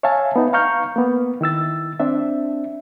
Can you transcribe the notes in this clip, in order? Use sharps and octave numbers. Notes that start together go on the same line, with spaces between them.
C#5 E5 F5 G#5 A5
B3 D#4
F5 A#5 C#6 F6 G6
A#3 B3
D#3 E4 E6 A6
C4 D4 E5